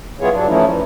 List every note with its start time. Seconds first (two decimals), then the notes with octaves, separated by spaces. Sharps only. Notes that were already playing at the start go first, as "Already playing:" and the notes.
0.20 F#3 B3 E4 F4 G#4 C#5
0.33 G2 F#3 D4
0.47 E3 F3 A3 C#4 D#4 E4
0.69 E3